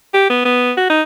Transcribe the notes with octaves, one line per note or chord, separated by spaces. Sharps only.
G4
B3
B3
F#4
D#4